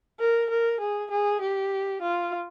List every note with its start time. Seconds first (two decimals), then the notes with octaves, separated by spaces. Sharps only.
0.19 A#4
0.50 A#4
0.80 G#4
1.11 G#4
1.41 G4
2.02 F4